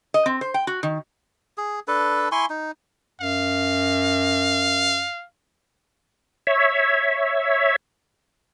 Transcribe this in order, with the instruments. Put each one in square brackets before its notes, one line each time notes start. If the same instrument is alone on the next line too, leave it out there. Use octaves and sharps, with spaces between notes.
[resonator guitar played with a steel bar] D#5
C4
C5
G5
F#4
D#3
[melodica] G#4
D4 A4 B4
E4 G#5 C6 C#6
D#4
[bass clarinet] F#2 [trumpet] F5
[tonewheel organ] C#5 E5